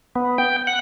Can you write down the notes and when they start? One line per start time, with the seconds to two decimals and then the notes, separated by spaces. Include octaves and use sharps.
0.15 B3
0.38 G5
0.67 F#5